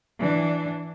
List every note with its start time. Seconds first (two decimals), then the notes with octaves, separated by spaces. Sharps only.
0.18 E3 D4